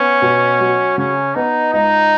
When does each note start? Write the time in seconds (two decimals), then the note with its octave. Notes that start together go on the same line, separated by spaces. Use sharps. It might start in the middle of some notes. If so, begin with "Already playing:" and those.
Already playing: B3 C#4
0.22 B2
0.60 F#3
0.98 C#3 C#4
1.35 B3 D#4
1.73 C#2 D#4